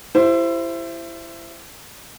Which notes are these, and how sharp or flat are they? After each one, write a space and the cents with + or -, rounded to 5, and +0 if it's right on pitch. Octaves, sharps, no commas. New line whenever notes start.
E4 +25 G4 +0 C5 +0